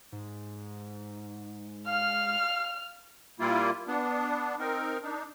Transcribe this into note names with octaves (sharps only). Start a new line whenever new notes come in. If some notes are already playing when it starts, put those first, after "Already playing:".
G#2
F5 F6
A#2 G3 A#3 E4 F4
B3 D4
C4 D#4 A#4
D4 D#4